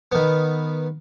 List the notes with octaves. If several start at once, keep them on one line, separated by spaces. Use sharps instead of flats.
D#3 B3